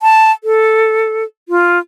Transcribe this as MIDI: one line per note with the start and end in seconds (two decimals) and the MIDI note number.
0.01 0.31 81
0.44 1.24 69
1.49 1.79 65